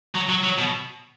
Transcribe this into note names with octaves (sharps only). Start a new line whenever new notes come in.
F#3
F#3
F#3
B2